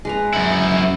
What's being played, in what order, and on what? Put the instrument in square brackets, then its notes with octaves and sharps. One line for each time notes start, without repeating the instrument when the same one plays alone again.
[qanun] G#3 B4 A#5
[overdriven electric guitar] F#2 E4